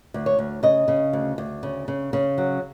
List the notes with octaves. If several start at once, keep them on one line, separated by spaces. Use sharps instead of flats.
D2
C#5
D2
C#3 D#5
C#3
D2
D2
C#3
C#3
C#3
F#3